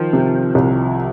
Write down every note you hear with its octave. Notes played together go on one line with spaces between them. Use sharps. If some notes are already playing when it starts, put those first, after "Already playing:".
Already playing: D#3 F3
C3
C2